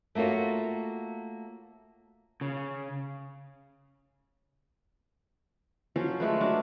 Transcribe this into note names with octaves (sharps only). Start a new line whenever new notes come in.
A3 A#3 F4 F#4 C#5
C#3
F3 F#3 C#4 C5
G#3 A3 B4
F#3 D4